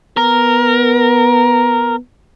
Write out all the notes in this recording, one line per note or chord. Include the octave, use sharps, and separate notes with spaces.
B3 A#4